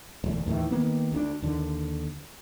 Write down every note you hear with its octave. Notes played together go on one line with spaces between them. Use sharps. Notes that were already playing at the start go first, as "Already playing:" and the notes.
E1 D2
D#2 A2 D#3 E3
D#3 A#3 B3
D2 A#3 D4
D#2 D3